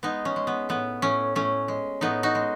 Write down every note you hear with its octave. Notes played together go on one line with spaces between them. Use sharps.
G#3 B3 D#4
C#4
G#3
B3
A2 B3
A2 C#4
A2 C#4
G#3
A2 B3 D#4
D#4 F#4
G#3